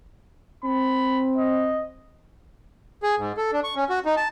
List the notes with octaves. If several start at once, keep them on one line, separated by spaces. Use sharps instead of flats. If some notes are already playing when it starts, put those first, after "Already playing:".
C4 B5
D#5
G#4
G#2
A4
D4
C#6
C#4
F#4
D#4
A5